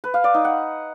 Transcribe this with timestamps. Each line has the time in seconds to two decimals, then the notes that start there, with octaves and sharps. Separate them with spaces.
0.04 B4
0.14 F5
0.24 D5
0.34 D#4
0.44 F#5